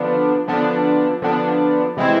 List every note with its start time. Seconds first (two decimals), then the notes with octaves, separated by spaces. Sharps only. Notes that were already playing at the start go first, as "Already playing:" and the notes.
Already playing: D3 F3 B3 D4
0.48 D3 F3 B3 D4
1.22 D3 F3 B3 D4
1.97 C3 E3 G#3 C4 E4